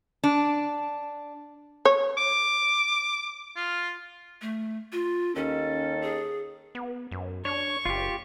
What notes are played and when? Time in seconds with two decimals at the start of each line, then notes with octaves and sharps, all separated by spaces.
0.24 D4
1.85 C#5
2.18 D6
3.56 F4
4.41 A3
4.92 F4
5.35 D#2 D#3 C#4 A4
6.02 G#4
6.75 B3
7.11 F#2
7.45 D4 C#5 C#6
7.85 F#1 F4 G4